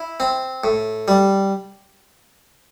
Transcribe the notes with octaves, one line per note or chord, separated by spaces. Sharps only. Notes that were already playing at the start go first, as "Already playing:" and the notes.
Already playing: E4
C4
A2
G3